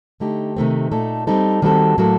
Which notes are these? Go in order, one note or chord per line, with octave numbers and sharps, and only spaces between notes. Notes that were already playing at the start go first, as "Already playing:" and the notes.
D3 A3 D#4 G4
C3 D#3 A3 C4
A#2 A3 D#4 A4
G3 C4 D#4 A4
D#3 G3 C4 F#4 A4
A2 F#3 A#3 F#4 A4